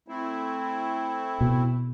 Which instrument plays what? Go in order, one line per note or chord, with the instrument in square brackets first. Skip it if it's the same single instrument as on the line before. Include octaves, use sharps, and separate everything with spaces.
[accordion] A3 C4 E4
[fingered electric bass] B2